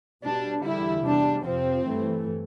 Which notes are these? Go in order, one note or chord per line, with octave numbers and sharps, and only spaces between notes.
B2 G3 D4
E2 D3 G3 E4
E2 C3 G3 D4
F2 C3 F3 C4
G2 E3 A3